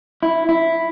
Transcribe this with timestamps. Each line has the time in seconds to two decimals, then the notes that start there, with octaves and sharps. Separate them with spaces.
0.23 E4
0.49 E4